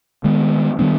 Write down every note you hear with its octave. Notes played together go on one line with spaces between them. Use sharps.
D#3 G#3 B3
D#3 G3 B3 D4